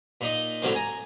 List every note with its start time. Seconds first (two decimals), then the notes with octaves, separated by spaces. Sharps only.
0.21 A#2 D#4 D#5
0.62 A2 D3 F#3 A#3 C4
0.75 G#5 A#5